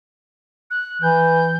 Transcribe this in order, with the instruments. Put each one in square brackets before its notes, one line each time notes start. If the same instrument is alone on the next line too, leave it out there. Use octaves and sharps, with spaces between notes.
[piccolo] F#6
[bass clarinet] E3 [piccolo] G6